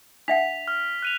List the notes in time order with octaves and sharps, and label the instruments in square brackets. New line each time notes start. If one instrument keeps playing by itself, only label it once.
[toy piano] D4 E5 F#5 [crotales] B6 F7
[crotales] F6
F#6 D#7 F7